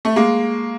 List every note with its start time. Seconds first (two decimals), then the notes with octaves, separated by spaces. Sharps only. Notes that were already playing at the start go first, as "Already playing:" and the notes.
0.05 A3
0.16 G#3 A#3